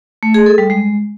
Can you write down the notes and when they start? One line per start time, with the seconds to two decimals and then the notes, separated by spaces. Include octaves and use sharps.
0.23 A3
0.34 G#4
0.46 A4
0.58 G3
0.70 G#3